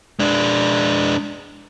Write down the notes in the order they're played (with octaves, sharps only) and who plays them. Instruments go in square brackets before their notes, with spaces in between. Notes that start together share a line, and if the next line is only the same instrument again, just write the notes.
[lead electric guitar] G#3 D4